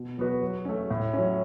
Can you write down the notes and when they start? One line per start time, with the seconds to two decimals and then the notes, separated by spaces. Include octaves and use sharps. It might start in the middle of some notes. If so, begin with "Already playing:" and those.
Already playing: B2
0.18 F#3 B3 F#4 B4
0.42 F#3
0.65 A3 C#4
0.90 A2
1.13 F#3 C#4